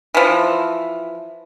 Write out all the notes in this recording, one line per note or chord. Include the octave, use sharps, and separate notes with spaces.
E3 F3